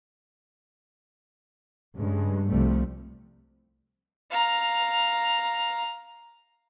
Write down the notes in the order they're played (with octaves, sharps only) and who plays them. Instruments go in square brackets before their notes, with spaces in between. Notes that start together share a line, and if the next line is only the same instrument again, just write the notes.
[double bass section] G2 C#3 G#3
C2 C3 F3 G3 A3
[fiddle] F5 A#5